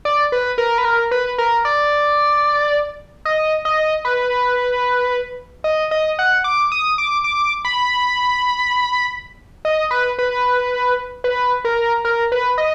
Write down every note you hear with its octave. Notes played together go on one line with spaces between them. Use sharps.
D5
B4
A#4
B4
A#4
B4
A#4
D5
D#5
D#5
B4
D#5
D#5
F#5
D6
D#6
D6
D6
B5
D#5
B4
B4
B4
A#4
A#4
B4
D#5